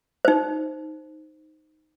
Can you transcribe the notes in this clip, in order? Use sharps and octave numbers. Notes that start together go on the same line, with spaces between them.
D#4 C5